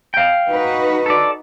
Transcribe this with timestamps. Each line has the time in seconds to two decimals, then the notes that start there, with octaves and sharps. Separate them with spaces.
0.14 F5 G5
0.49 D#4 F#4 B4
1.06 A4 D5